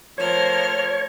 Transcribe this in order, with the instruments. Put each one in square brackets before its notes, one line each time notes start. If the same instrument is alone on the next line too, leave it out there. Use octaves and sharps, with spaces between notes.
[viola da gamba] F3 A3 A#4 [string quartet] C5 F6 [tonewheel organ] C#5